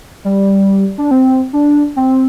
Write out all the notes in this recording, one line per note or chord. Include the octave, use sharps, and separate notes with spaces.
G3
D4
C4
D4
C4